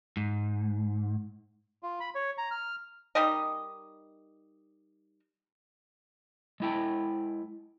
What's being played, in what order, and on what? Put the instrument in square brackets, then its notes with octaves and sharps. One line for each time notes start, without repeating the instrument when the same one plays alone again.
[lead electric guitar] G#2
[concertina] F4
B5
C#5
A#5
F6
[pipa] G3 D#4 A#4 D#5
[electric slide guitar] G#3 E4 G5